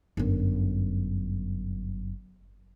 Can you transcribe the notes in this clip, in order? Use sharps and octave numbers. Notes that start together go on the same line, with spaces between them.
G1 F#2